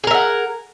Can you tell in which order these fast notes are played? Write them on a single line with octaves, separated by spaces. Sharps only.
G#4 A#4 E5 F#5